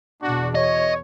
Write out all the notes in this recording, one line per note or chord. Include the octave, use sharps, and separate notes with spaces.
E2 B2 D4 F#4
C#5 D#5